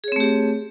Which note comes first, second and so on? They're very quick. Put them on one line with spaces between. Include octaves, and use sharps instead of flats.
G#4 C#5 C4 A3 G4